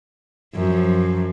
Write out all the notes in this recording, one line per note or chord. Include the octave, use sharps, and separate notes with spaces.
F#2 F3